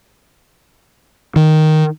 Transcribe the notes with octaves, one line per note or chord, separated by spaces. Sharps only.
D#3